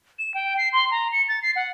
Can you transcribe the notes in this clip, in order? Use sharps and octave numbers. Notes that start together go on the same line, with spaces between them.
E7
G5
C7
C6
A#5
C#7
A6
C7
F#5